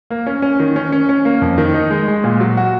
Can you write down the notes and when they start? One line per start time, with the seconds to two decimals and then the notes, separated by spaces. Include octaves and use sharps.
0.10 A#3
0.26 C#4
0.42 C#4
0.60 D#3
0.76 C#4
0.92 C#4
1.09 C#4
1.25 A#3
1.41 F2
1.58 D#3
1.74 D#4
1.91 G#3
2.08 G#3
2.24 A#2
2.40 F#3
2.57 F#4